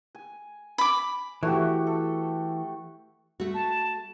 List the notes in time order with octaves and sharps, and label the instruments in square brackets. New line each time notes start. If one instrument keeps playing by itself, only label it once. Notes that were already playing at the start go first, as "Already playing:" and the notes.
[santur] G#5
[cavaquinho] B5 D6
[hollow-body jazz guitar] E3 [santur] A3 F#4 G4
[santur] A4
[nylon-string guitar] A3 F#4
[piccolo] A5